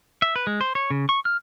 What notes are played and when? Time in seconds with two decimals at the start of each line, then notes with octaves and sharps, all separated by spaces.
0.22 E5
0.36 B4
0.47 G#3
0.61 C5
0.75 C#5
0.90 C#3
1.09 C#6
1.25 F6